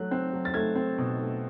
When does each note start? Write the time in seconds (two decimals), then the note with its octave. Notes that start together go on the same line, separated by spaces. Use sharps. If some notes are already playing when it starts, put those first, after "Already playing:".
Already playing: F#3 A3 F#6
0.11 C4
0.33 F#3
0.45 A6
0.54 A3 G#6
0.75 C4
0.98 B2
1.18 A3